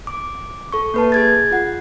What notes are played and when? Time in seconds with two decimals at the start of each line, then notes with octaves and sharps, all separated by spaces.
0.07 D6
0.72 A4 C#6
0.94 A#3 B4 A5
1.12 G#4 G#6 A6
1.51 F4 F#5